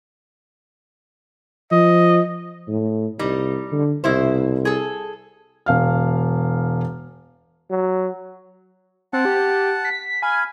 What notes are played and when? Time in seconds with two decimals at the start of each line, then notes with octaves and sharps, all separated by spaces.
1.71 F3 D#5
2.68 A2
3.19 C2 G3 D#4
3.72 D3
4.04 C2 B2 E4 C5
4.65 G#4 A4
5.66 E1 F5 F6
7.71 F#3
9.13 C4 F#5 A5
9.25 G4
9.85 B6
10.22 F5 G#5 B5